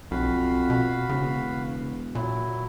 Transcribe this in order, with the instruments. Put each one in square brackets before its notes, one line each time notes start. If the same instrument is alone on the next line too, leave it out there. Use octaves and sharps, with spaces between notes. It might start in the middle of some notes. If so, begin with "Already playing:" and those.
[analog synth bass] B1 [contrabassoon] F2 [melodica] F#4 F5 B5
[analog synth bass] B2
[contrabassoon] E1 [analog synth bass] C#3
[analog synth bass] A#2 [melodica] F#3 E4